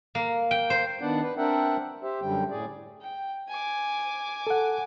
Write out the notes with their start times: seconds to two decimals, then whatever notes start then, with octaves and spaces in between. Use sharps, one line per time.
0.15 A#3
0.51 G5
0.70 C5
1.01 D#3 B3 D4 D5 F#5
1.23 B4
1.37 C4 D4 A#4 E5 F#5 G5
2.02 G4 C5 E5
2.22 F#2 D3 G3 G5
2.50 A2 G#4 D5
3.01 G5
3.49 G#5 D6
4.47 A4 F#5